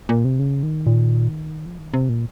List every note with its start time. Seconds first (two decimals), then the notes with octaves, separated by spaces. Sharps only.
0.09 A#2
0.25 C3
0.39 C#3
0.63 D#3
0.86 A#2
1.66 F3
1.78 D#3
1.94 C3
2.09 A#2